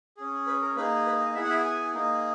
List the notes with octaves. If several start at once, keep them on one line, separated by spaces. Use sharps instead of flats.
C#4 G#4
B4
A#4
A#3 D#4 G#4 B4
B4
D#5
B3 E4 G#4 E5
F#5
E5
G#5
A#3 D#4 G#4